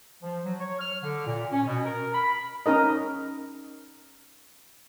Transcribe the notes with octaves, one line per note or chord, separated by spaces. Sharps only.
F3
F#3
C#5
F6
D3
A#2
C#4
B2
A#4
B5
C#4 D#4 A#4 D#5